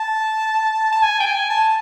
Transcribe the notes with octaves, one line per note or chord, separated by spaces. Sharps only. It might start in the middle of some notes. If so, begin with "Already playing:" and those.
Already playing: A5
A5
G#5
G5
G#5
A5